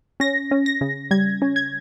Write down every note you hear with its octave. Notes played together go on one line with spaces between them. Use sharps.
C#4 A#6
C#4
A#6
C#3
G3 G#6
C#4
G#6